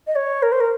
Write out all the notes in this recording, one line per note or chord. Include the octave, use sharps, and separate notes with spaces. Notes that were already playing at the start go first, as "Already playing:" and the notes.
D#5
C#5
A#4
C5
A#4